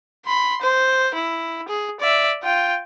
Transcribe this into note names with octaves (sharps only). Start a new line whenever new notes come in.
B5 C6
C5
E4
G#4
D5 E5
F4 G5